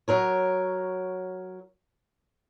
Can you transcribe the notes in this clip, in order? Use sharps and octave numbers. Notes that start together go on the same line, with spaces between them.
F#3 A#4 C#5